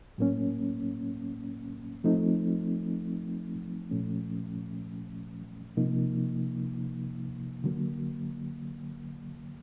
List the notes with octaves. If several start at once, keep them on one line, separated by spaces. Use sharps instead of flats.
A2 F#3 A#3 C#4
F3 A3 C4 D#4
A#2 F3 A3 C#4
C3 F3 A#3 D#4
D3 F#3 A#3